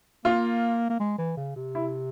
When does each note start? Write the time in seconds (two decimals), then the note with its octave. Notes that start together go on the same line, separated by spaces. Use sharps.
0.25 A#3 F4
0.89 A#3
1.00 G#3
1.18 E3
1.37 C#3
1.56 C3
1.75 E4